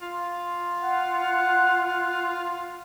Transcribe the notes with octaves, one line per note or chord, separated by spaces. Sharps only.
F4
F#5